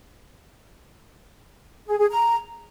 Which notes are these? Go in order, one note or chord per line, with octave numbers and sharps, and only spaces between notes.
G#4
G#4
A#5